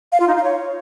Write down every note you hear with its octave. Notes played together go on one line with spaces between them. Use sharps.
F5
F4
D#4
F5
C#5